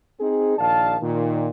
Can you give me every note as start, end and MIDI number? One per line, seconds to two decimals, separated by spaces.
0.20 0.54 60
0.20 0.54 63
0.20 0.54 68
0.58 0.96 34
0.58 0.96 51
0.58 0.96 74
0.58 0.96 77
0.58 0.96 81
1.02 1.49 46
1.02 1.49 51